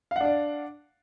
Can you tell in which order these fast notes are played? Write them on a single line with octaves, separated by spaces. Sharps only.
F5 F#5 D4 D5